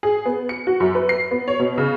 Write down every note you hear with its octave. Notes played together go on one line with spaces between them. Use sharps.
G#4
B3
C#7
F#4
F#2
B4
C7
B3
C#5
B2
C#3